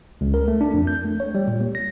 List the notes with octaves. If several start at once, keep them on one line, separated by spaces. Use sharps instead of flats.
C#2
A#4
A3
D4
F2
G6
A3
C#5
G3
A#2
A#3
A#6